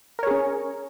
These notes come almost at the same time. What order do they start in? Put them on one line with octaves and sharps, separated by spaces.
A#4 C#5 G#4 C#4